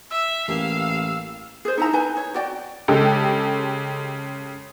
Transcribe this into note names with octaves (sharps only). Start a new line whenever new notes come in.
E5 E6
A1 A#3 G4 F5
G#4 C5
D#4 E4 A#5
D#4 B4 G#5
C#5
F#4 D5 G5
C#3 G#3 G4 A4